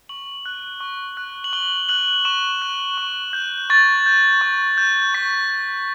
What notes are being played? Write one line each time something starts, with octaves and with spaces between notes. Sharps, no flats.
C#6 F#7
F#6
C#6
F#6
F#7
C#6 G7
F#6 F#7
C#6 E7
F#6
C#6
G6
C#6 A6
G6
C#6
G6
C#6 B6
G6